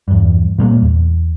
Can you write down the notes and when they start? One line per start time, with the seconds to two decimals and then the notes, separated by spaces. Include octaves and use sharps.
0.08 E2 G2
0.58 A#2 G3 A3 A#3
0.82 E2